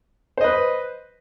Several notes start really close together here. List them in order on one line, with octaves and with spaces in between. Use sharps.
C5 D#5 B4